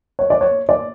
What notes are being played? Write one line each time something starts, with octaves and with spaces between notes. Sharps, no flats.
C#5
D5
C#5
D5